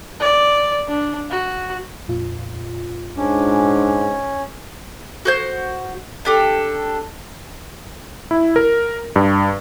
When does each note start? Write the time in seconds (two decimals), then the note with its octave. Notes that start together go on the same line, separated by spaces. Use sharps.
0.20 D5
0.88 D4
1.30 F#4
2.08 F2 A#2 F4
3.17 G#2 C#4 D4
5.25 F#4 C5 G6
6.25 D4 G4 A4
8.31 E4
8.56 A#4
9.16 G2